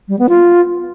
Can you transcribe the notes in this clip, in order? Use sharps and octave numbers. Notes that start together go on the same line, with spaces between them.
G3
B3
F4